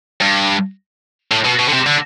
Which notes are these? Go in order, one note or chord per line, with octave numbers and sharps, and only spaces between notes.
G2
A2
B2
B2
D3
C3
D3